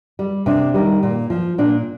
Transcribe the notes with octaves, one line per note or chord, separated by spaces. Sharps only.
G3
C3 D4
D#3 G3
A#2
F3
A#2 D4